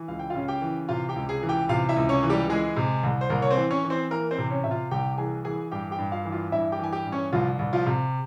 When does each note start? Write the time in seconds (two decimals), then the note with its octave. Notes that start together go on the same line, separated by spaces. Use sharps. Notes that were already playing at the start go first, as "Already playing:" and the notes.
Already playing: E3
0.08 C#2 F5
0.19 G5
0.30 F4 F5
0.35 C#3
0.48 G4 G5
0.62 E3
0.88 C3 F4 F5
1.09 G4 G5
1.15 C#2
1.29 G#4 G#5
1.43 E3
1.49 G4 G5
1.69 C3 F4 F5
1.89 E4 E5
1.96 C#2
2.09 C#4 C#5
2.23 E3
2.30 G3 G4
2.49 E3 G#3 G#4
2.76 C3
3.03 C2
3.21 C5
3.30 C2 A#3 A#4
3.42 C#5
3.51 C4 C5
3.57 E3
3.71 C#4 C#5
3.84 E3
3.90 C4 C5
4.11 E3 A#3 A#4
4.31 C4 C5
4.38 C3
4.50 C#4 C#5
4.64 C3 E5
4.71 F4 F5
4.91 C2 G4 G5
5.18 E3 G#4 G#5
5.44 E3 G#4 G#5
5.72 G2 G4 G5
5.91 G4 G5
5.98 G2
6.12 F4 F5
6.25 E3
6.32 F4 F5
6.52 G2 E4 E5
6.72 G4 G5
6.79 E3 G#5
6.92 G4 G5
7.06 G2
7.12 C#4 C#5
7.32 C2 F3 F4
7.59 C2
7.73 F3 F4
7.86 C3